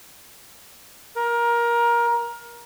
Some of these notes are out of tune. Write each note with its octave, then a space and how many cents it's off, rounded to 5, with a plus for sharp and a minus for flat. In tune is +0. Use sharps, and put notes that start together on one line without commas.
A#4 +20